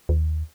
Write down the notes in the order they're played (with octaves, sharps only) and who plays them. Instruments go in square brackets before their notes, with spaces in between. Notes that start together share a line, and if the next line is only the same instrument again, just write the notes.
[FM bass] D#2